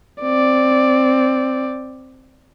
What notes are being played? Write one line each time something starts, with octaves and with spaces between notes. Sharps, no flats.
C4 D5